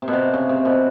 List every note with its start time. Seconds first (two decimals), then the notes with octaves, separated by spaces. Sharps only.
0.02 C3
0.08 B2
0.13 C3
0.34 C#3
0.49 C3
0.65 B2